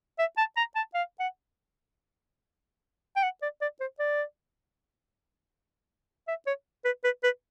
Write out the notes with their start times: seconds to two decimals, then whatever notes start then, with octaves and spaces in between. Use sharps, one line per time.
0.19 E5
0.38 A5
0.57 A#5
0.76 A5
0.94 F5
1.20 F#5
3.16 G5
3.23 F#5
3.42 D5
3.61 D5
3.80 C5
3.99 D5
6.28 E5
6.47 C#5
6.85 B4
7.04 B4
7.23 B4